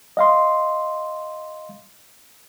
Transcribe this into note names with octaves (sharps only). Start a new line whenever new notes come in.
D#5 F5 C6